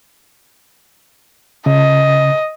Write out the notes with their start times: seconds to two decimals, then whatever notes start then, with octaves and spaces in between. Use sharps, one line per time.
1.66 C#3 D#5